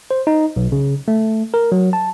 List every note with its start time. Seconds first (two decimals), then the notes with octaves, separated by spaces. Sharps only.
0.11 C5
0.27 D#4
0.56 B1
0.72 C#3
1.08 A3
1.54 A#4
1.72 F#3
1.93 A5